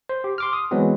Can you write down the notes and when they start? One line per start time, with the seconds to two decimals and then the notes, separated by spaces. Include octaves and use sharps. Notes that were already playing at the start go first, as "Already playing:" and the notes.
0.09 C5
0.24 G4
0.38 C6 D6 F6
0.53 D#6
0.71 E3 F#3 G#3 B3 C4